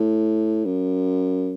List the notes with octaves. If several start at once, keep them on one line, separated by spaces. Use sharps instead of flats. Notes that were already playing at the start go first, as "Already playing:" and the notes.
Already playing: A2
F#2